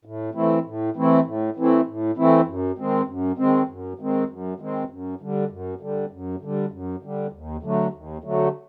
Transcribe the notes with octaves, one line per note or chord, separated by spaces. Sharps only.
A2
E3 A3 C4 E4
A2
E3 A3 C4 E4
A2
E3 A3 C4 E4
A2
E3 A3 C4 E4
F#2
D#3 G#3 C4
F#2
D#3 G#3 C4
F#2
D#3 G#3 C4
F#2
D#3 G#3 C4
F#2
D3 G3
F#2
D3 G3
F#2
D3 G3
F#2
D3 G3
D#2
D3 F#3 A3
D#2
D3 F#3 A3